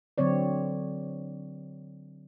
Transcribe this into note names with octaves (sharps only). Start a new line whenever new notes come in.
D3 F#3 C4 C#5 D5